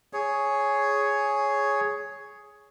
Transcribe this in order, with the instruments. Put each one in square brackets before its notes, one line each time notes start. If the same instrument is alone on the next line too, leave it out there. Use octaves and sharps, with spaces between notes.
[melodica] G#4 C#5